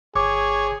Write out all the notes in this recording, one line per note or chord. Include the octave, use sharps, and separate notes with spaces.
G1 G#4 C#5 D6